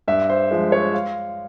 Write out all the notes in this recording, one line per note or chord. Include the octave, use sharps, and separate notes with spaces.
G2 E5
C5
F3 G#3
C#5
F5